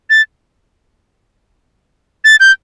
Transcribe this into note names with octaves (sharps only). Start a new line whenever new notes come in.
A6
A6
G6